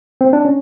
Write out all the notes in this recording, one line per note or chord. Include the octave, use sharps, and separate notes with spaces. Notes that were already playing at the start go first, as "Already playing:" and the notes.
C4
D4
C#4